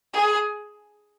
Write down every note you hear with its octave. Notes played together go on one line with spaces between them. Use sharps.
G#4